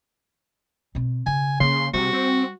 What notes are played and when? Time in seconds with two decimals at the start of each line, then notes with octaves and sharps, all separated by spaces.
0.95 B2 C4
1.26 C#3 G#5
1.60 C#3 A#3 C6
1.94 C3 G3 F#4
2.13 C4